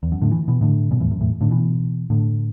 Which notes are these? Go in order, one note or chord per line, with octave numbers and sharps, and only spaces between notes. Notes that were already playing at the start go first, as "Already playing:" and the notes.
E2
F#2
A2 D3
E3
B2 E3
A2 D3
F#2 B2
E2 A2
F#2
E2 A2
A2 D3
B2 E3
A2 D3